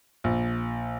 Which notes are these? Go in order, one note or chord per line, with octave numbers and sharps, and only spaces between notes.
A#1